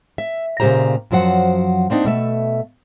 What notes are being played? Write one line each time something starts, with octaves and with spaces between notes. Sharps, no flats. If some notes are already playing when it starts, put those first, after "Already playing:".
E5
A#2 C#3 F3 G4 C5 A#5
F#2 F3 F#3 C5 F#5
A#3 C4 D4 D#4
B2 A3 E5